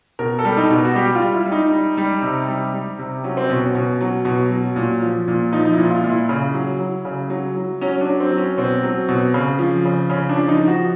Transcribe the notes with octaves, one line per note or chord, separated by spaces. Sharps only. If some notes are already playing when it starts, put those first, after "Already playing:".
B2 A#4
A4
G3
D#4
B2
F#4
G3 G4
F4
G3
E4
G3
D#4
G3
G3
C3
G3
G3
C3
F#3 C#4
C4
B2 C#4
B2
F#3
B2
F#3
A#2
F3
A#2
F3 D#4
D#4
E4
A#2
F4
A#2
E4
C#3
F#3
F#3
C#3
F#3
F#3
F#3 C#4
C#4
D4
F#3
C4
F#3
C#4
B2 C4
F#3
B2
C#3
F3
C#3
C#3 C#4
D4
F3
D#4
F3
F#4